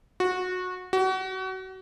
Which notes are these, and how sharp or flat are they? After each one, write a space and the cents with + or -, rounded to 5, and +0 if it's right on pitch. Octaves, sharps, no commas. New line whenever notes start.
F#4 -20
F#4 +30